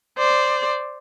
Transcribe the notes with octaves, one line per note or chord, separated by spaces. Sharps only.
C5 D5